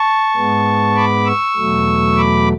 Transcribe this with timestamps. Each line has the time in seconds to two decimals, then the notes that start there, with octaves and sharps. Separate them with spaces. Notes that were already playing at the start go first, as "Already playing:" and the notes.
Already playing: A5 C#6
0.35 G#2 G#3 B3
0.96 B5 D6
1.26 C#6 E6
1.57 E2 B2 F#3 A3
2.17 B5 D6